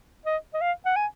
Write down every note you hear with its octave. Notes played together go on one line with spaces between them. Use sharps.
D#5
D#5
F5
F#5
G#5